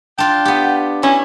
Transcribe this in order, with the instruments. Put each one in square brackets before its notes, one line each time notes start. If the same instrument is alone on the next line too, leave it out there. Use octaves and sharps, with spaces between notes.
[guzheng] D4 F4 [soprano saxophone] G5
[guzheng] B3 G4
[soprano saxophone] C#4 [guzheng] E4